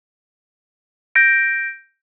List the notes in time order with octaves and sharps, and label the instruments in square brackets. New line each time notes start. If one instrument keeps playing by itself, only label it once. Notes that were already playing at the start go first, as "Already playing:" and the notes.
[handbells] G6 A#6 D7